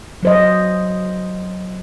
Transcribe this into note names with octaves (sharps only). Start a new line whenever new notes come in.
F#3 C5 D#5